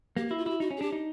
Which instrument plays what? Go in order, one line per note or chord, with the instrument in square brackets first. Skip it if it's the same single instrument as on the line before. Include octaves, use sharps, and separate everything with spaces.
[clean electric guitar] A#3 [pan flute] G4
[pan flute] F#4
[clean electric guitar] E4
[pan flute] F4
[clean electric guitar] E4 [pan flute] F#4 G4
[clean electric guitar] D#4 [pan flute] F#4
[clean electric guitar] C#4
[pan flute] G#4
[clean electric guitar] D4 [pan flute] G4
[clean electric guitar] D#4